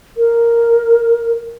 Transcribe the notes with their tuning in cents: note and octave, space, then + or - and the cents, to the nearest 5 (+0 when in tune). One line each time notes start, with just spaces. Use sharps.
A#4 +0